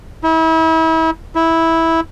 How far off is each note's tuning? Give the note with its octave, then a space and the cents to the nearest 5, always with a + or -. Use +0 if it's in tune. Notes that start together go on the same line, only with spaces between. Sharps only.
E4 -35
E4 -10